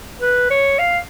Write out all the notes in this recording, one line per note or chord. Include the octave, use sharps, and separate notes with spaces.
B4
C#5
F5